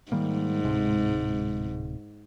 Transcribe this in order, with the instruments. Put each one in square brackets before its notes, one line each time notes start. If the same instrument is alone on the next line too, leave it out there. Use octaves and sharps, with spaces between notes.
[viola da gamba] G#2 [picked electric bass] D#3 G3 A#3
[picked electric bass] D1 C3 G#3